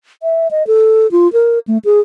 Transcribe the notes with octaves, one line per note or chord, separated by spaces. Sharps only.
E5
D#5
A4
F4
A#4
A3
G#4